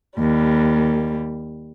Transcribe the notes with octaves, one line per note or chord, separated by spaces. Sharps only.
D#2 G3